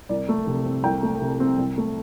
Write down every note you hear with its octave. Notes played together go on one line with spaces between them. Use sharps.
C2 D5
A3
C3
C4
C2 G5
A3
C3
C4
C2
A3